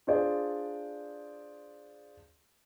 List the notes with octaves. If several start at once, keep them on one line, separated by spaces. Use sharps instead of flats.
D4 F4 G#4 C5 D5